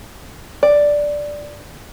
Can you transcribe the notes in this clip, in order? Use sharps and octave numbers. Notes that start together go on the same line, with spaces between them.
D5